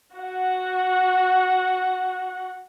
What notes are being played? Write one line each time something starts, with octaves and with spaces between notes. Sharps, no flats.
F#4 F#5